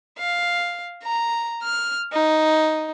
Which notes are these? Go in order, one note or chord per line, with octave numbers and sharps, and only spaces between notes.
F5
A#5
F6
D#4